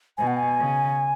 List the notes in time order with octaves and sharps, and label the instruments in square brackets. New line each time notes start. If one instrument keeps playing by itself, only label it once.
[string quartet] B2 [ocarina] G#5
[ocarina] F#5
G#5
[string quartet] C#3